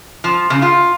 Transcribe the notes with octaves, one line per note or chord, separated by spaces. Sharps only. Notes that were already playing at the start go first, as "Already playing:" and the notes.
F3
C#3
F4